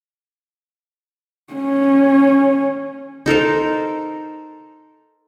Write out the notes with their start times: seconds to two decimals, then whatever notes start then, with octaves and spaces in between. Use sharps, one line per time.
1.53 C#4
3.26 D#4 A4 A#4 C5